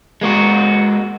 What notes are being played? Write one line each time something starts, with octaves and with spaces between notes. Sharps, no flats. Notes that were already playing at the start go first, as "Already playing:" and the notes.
G#3 A#3 D4 F#4